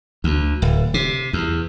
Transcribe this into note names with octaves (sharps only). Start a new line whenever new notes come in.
D2
D1
C3
E2